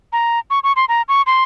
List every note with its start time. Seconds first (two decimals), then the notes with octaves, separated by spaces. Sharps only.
0.13 A#5
0.50 C#6
0.64 C#6
0.76 C6
0.89 A#5
1.09 C#6
1.26 C6